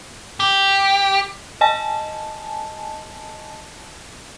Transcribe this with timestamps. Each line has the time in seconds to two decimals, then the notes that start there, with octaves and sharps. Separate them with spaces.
0.40 G4
1.61 D#5 G#5 A5